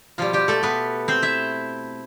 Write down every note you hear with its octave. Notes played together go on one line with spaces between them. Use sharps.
B2 F3 G3 F4
G3 G4
A3 A4
B3 B4
C4 C5
E4 E5